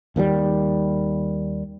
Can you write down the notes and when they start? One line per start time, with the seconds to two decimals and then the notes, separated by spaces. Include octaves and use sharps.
0.16 D#2 D#3 F3 G3